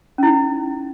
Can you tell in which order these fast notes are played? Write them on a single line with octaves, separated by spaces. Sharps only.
C#4 E4 D#4